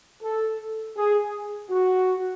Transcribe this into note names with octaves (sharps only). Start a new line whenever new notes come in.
A4
G#4
F#4